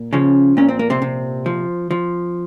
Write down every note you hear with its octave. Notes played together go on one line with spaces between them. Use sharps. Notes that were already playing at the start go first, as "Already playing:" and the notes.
Already playing: A#2
C#3 F3 C#4
A#2 C#4
C4
A#3
C3 C4
C3
F3
F3